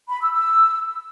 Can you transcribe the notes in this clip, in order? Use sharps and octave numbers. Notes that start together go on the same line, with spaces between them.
B5
E6
E6